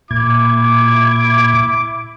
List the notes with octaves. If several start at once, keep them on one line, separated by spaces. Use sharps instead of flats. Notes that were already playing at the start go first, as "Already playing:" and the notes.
A#2 E4 D6 G#6